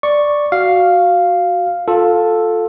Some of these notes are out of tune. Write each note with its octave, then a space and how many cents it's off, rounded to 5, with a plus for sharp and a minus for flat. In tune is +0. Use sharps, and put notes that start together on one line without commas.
D5 +0 C#6 +0
F#4 +0 F5 +0
F4 +15 A4 +0